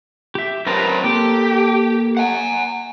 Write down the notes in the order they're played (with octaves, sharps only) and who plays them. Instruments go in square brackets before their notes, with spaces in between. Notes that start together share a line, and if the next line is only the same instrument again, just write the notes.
[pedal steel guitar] G4 E5
[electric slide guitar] F#2 C4 B4 [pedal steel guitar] A#4 A5 A#5
[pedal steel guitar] A#3 A4 [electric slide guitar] G4
[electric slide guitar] F#5 G#5